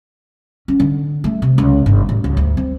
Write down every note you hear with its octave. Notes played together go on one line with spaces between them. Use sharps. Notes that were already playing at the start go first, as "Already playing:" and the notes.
C#4
D3
A3
C3
C#2
G1
A1
C#2
D2
C4